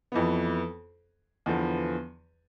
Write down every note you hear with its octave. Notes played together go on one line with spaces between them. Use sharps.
F2 E3 B3
E2 D3 F3 B3